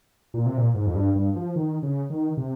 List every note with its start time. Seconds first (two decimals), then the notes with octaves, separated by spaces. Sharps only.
0.34 A#2
0.46 C3
0.57 A#2
0.75 G#2
0.86 F2
0.95 G2
1.15 G2
1.36 F3
1.56 D#3
1.83 C#3
2.10 D#3
2.37 C3